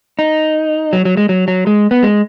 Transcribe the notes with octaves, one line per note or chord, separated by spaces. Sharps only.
D#4
F#3
F#3
G#3
F#3
F#3
G#3
B3
G#3